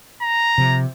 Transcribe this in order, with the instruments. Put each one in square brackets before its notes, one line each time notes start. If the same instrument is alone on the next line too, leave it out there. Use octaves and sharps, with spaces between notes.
[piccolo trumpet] A#5
[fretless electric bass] C3 F3